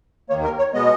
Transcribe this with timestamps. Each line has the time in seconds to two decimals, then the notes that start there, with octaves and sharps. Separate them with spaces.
0.30 D#2 D#3 A#3 C#5
0.44 A#4
0.58 C#5
0.74 B2 G#3 B3 D#5